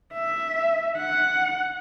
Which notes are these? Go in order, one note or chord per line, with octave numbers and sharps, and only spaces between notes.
E5
F#5